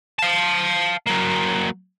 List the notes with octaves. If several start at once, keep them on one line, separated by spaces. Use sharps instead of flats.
F5 A5
F#3 A#3